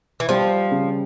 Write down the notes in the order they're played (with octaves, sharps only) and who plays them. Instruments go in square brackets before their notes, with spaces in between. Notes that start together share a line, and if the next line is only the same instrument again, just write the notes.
[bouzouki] E3
[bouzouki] F3 [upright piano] G3
[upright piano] C#3